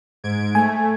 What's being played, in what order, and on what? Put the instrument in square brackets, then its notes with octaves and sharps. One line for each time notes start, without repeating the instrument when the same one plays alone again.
[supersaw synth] G#2 G#6 D7
[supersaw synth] A3 [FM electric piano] G#5